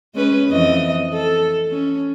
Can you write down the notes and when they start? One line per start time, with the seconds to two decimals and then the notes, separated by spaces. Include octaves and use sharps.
0.15 G#3 C#4 B4
0.48 F2 E3 D#5
1.13 A4
1.71 C#4